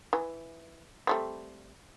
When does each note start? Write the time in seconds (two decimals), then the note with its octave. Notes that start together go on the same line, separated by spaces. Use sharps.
0.13 E3
1.07 G3 A3 C4